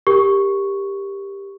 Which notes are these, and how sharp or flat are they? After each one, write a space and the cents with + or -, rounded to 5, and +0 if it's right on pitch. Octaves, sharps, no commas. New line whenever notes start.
G4 +15 A#4 +0 C#6 +0